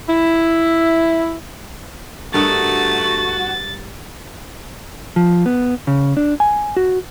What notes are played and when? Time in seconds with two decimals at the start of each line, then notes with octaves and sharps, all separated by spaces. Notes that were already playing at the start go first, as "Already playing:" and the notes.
0.08 E4
2.34 G2 A3 F#4 A#4 D#5 A6
5.16 F3
5.46 B3
5.87 C#3
6.17 D4
6.40 G#5
6.76 F#4